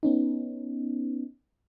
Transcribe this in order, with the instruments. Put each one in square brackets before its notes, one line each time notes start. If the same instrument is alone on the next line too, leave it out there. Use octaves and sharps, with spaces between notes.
[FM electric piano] B3 C#4 D#4